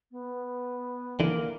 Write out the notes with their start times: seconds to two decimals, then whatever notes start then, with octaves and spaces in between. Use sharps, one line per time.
0.11 B3
1.20 D3 E3 A#3